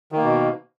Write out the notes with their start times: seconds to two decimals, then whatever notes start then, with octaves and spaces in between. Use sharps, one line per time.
0.12 D#3
0.17 A#3
0.22 B2